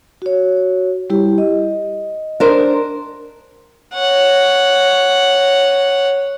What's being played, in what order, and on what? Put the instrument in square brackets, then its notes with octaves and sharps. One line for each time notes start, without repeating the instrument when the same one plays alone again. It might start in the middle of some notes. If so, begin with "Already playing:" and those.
[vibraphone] F#4 C#5
G3 E4 G4
D#5
[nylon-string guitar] D4 A#4 C5
[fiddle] C#5 F#5